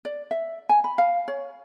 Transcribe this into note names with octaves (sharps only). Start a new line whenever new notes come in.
D5
E5
G#5
B5
F5
C#5